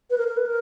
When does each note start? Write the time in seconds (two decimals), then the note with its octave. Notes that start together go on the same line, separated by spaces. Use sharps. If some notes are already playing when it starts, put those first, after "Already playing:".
0.10 B4
0.18 A#4
0.28 A#4
0.37 B4
0.46 A#4